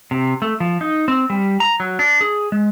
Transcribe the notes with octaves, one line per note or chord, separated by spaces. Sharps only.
C3
A3
F3
D#4
C4
G3
A#5
F#3
D4
G#4
G#3